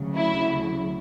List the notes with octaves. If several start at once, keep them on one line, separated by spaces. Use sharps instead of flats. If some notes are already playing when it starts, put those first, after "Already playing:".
Already playing: D2 C#3 F#3
E4